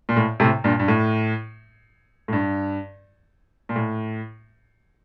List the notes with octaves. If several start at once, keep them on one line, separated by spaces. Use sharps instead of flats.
A#2
A2
A2 C3
G2 A#2
G2
A2
A2
G2
A#2
A2